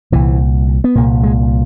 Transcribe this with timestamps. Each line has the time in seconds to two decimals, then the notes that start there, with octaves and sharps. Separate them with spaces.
0.12 C2 A#2 E3
0.84 B3
0.95 C2 A#2 A#3
1.23 G#3